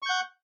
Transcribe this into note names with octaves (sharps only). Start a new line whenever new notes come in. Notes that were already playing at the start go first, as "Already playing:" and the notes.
F#5 C#6 G6